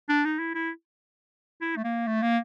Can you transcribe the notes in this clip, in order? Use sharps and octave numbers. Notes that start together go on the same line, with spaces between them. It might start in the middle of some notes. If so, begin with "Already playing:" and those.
D4
D#4
E4
E4
E4
A3
A#3
A3
A#3